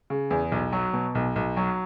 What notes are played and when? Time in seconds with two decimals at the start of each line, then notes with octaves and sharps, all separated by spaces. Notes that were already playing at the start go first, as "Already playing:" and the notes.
0.10 C#3
0.30 E2
0.52 B1
0.72 F#3
0.94 B2
1.15 B1
1.36 B1
1.57 F#3